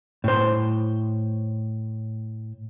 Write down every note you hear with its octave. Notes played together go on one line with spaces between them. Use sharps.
A2 C5